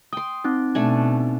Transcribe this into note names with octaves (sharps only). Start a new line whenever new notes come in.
G5 C6 D#6
C4 D#4
B2 A3 D4 G#5